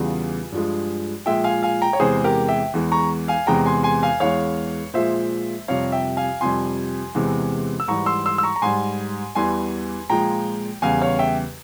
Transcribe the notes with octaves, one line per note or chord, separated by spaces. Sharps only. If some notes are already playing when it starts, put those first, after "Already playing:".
Already playing: E2 C#3 E3 G3 F4 G#4
G2 F3 G#3
A#2 F3 G#3 E5 G5
F5 G#5
F5 G#5
G5 A#5
C#5
E2 C3 E3 G#3 G#4 C5
G4 A#4
E5 G5
E2 E3 G#3
A#5 C#6
F5 G#5
E2 C3 E3 G#3 G5 A#5
G#5 C6
G#5 C6
F5 G#5
E2 E3 G#3 C#5 F5
A#2 F3 G#3 C5 E5
F2 C3 G3 C#5 F5
E5 G5
F5 G#5
F2 C3 G3 G#5 C6
E2 C3 E3 G#3
E6
G#2 E3 G3 A#5 C#6
C6 E6
C6 E6
E6
A#5 C#6
A#5
G#2 G3 G#5 C6
E2 E3 G3 G#5 C6
A#2 F3 G#3 G5 A#5
E2 C#3 G3 F5 G#5
C#5 F5
E5 G5